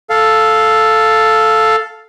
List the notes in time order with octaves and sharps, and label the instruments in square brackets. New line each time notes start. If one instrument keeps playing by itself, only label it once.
[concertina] A4 F5